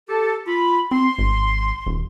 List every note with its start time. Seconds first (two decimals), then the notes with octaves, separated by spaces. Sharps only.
0.08 G4 A4
0.46 F4 B5
0.91 C4 C6
1.18 G#1
1.86 D#1